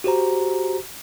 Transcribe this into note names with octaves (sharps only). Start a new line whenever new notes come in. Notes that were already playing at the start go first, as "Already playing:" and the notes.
F#4 G4 C5 A#5